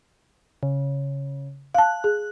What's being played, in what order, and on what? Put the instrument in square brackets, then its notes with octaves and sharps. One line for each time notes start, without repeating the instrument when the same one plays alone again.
[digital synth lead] C#3
[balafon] F5 A5 [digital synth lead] F#6
[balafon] G#4